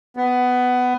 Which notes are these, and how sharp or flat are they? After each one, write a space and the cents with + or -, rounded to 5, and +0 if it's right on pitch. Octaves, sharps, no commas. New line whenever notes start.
B3 +15